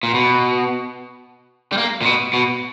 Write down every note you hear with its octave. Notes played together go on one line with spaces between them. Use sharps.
A#2
B2
G3
A#3
A#2
B2
B2